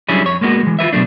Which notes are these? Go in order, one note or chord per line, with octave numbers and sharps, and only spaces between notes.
F#3 G3 C#4 D4 E4 G#4
F2 C#5
G#3 A#3 B3 D4 F#4
E3 G#3
F4 G#4 B4 E5
B2 F#3 A3 D4